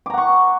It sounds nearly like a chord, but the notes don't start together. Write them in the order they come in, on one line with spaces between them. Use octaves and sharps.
D6 A#5 F#5 C#6